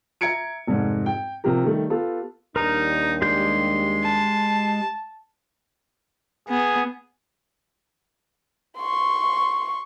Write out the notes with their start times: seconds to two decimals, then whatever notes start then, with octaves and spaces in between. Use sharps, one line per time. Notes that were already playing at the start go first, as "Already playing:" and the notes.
0.21 E5 A#5 G#6 C#7 D7
0.67 F1 G#2
1.06 G5
1.44 C3 F3 G4 A#4
1.64 D#3 G3 A3
1.90 B3 F4 G4 A4
2.56 D#2 G3 D4 D#4 A#4 A#5
3.22 G#3 G4 C6 G6
4.03 A5
6.49 B3 G#4
8.79 C6 C#6